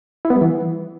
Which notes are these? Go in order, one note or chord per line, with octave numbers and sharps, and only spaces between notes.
E4
B3
G3
E3